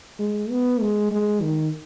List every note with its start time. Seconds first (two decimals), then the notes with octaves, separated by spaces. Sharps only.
0.20 G#3
0.50 B3
0.81 G#3
1.11 G#3
1.42 D#3